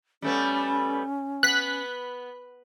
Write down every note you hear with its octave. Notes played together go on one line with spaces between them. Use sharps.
G3 A3 B3 C#4
B3 F#6 B6